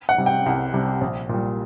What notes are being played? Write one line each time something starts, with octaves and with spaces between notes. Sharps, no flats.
F#5
C3 G3
G5
C2
C3 G3
A#1
A#2 G3